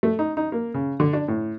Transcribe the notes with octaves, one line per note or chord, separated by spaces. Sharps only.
A3
D#4
D#4
A#3
C#3
D3
D4
A2